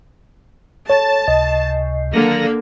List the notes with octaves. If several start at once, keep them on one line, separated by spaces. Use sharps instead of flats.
A4 C#5 A5
C#2 C3 D#5
D3 D#3 F#3 A#3 A#4